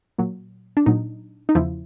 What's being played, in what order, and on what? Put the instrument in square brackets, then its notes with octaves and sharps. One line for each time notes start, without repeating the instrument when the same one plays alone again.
[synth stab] A#2 F#3
D4
A#2 F#3 D#4
D#4
E2 C#3 F3 E4